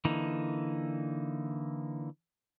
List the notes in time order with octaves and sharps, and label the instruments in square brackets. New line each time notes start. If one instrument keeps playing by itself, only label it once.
[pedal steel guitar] D3 E3 A#3 D#4